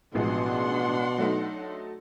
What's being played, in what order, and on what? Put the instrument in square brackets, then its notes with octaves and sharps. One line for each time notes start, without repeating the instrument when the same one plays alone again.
[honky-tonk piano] A1 F3 G#3 [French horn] B2 [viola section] D4 F#5 C6
[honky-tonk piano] F#3 A3 D#4